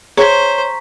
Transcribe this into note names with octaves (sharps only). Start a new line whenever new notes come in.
G#4 C5 C#5 A#5 C#6 B6